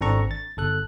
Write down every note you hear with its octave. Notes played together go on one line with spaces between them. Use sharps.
G#1 C4 D4 A4 A#5 C#6
A6
G1 A4 F#6